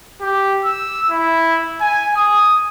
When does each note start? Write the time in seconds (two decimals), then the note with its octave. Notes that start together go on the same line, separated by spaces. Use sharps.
0.21 G4
0.65 E6
1.11 E4
1.81 G#5
2.16 D#6